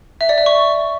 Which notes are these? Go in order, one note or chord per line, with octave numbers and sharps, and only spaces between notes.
E5
D5
E5
C#6